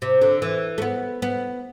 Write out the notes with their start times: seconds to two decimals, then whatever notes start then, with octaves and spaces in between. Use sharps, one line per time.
0.02 C3
0.22 D3
0.42 E3
0.78 A3
0.82 B3
1.22 B3